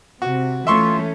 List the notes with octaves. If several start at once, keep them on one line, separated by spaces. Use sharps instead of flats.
C3 F#4
E3 A3 C#4 F4 E5 C6 C#6